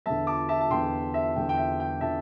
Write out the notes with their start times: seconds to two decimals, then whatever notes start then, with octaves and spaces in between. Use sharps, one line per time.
0.06 E2 D3 E5 A5
0.27 A5 D6
0.49 E5 A5
0.61 A5
0.71 E2 D3 G5 C6
1.14 E5
1.36 E2 D3 G5
1.49 G5
1.57 E5
1.80 G5
2.01 D3 E5 A5